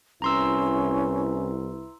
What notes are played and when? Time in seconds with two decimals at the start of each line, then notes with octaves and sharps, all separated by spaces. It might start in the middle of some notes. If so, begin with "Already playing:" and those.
0.22 C2 C#4 E4 B4 A#5 C6 E6